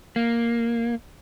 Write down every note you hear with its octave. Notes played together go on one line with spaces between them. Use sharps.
A#3